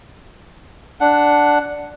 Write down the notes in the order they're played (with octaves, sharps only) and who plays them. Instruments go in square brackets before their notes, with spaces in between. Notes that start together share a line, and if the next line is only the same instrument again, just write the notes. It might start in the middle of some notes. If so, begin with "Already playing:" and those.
[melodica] D4 F#5